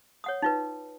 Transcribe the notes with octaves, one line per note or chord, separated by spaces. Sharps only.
C#5 F#5 D#6
D#4 F4 B4